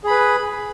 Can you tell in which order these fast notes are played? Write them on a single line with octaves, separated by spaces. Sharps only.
G#4 B5 B4